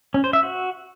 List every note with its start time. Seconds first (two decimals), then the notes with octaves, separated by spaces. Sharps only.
0.14 C#4
0.24 C5
0.33 E5
0.43 F#4